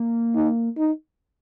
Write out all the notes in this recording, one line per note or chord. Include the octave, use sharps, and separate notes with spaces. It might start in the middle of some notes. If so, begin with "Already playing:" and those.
Already playing: A#3
D#4
D#4